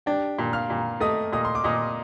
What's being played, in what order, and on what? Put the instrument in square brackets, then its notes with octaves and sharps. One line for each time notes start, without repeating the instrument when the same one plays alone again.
[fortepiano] D4 [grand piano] G4 G5
[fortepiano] A#2
[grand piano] F5 F6
[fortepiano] A#2
[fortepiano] A3 [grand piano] D#5 D#6
[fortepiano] A#2 [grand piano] D#5 D#6
[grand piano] C6
D6
[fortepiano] A#2 [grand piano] D#5 D#6